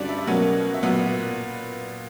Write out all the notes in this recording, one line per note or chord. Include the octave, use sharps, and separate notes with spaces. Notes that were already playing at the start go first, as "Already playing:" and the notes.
Already playing: G2 D3 G3 C#4 F#4 D5
E5
B2 F#3 A#3 C#4 F#5
E5
A#2 F#3 B3 F#5